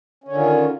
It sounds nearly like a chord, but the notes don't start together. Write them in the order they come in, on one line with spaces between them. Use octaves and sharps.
C#4 D3 D#3 F4